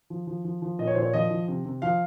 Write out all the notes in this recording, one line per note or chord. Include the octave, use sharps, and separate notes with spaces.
F3
F3
F3
F3
A#2 D#5
C#5
A#2 C5
C#5
F3 D#5
F3
C3
C3
F3 F5